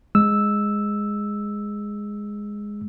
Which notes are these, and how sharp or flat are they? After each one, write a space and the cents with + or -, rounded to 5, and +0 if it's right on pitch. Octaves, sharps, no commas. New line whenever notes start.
G#3 -5 E6 -5